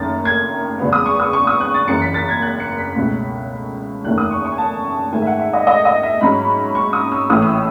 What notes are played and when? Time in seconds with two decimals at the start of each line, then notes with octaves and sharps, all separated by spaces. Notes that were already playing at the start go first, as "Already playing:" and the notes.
Already playing: F#1 F#2 D#3 A3 A6
0.25 G#6
0.79 E2 C#3 G#3 B3
0.93 D#6
1.06 C#6
1.20 D#6
1.33 C#6
1.47 D#6
1.60 F#6
1.74 A6
1.87 F#1 F#2 E3 C#7
2.01 B6
2.14 A6
2.29 G#6
2.42 F#6
2.60 C#7
2.78 B6
2.96 C#2 B2 A3 C#4
4.04 F#1 E2 D#3 A3 C#4 F#6
4.18 D#6
4.31 C#6
4.45 C#6
4.52 G#5
4.58 A5
5.12 G#2 D#3 A3 G#5
5.22 E5
5.27 F#5
5.40 E5
5.53 D#5
5.67 D#5
5.85 D#5
6.03 E5
6.21 G#2 F#3 C#4 B5
6.75 C#6
6.93 D#6
7.12 E6
7.30 A1 A2 E3 A3 C#4 D#6
7.42 E6